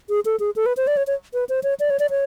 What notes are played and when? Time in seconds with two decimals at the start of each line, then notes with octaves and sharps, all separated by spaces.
0.09 G#4
0.25 A4
0.40 G#4
0.56 A4
0.66 B4
0.77 C5
0.87 D5
0.97 C#5
1.07 C#5
1.34 B4
1.49 C5
1.63 C#5
1.80 D5
1.90 C#5
1.99 D5
2.10 C#5